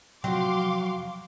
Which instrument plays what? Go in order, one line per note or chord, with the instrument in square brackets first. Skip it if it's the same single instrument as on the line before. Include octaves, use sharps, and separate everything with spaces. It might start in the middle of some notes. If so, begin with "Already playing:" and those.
[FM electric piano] C3 F3 [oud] F#3 [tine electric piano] F#4 G5 [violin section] F5 C6 D6